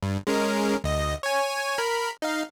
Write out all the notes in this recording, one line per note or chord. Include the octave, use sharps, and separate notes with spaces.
G2
G#3 C#4 A#4
D2 D#5
C#5 G#5
A#4 B5
D#4 F5